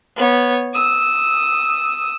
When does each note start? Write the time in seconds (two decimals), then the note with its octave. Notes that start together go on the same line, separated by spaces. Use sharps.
0.16 B3 C#5
0.73 D#6 E6